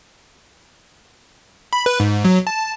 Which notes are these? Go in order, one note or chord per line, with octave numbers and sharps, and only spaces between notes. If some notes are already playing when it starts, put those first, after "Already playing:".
B5
B4
G#2
F#3
A5